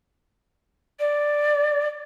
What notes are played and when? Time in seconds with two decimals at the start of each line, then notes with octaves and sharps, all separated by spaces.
0.99 D5